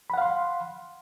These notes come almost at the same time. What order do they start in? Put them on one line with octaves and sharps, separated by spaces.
B5 F#5 F5 C6